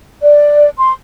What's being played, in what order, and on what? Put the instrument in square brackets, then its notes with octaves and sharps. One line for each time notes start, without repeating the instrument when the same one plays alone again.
[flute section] D5
C6